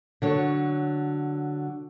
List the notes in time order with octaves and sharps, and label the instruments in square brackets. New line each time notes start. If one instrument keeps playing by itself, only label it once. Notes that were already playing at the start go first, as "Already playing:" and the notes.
[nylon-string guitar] D3 F#3 C#5